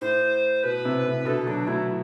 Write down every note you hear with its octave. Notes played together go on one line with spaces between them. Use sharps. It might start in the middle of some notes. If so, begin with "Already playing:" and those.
A2 C5
B2 B4
A2 C3
A2 C3
B2 D3 A4
D3 F#3 D4
F#3 A3 E4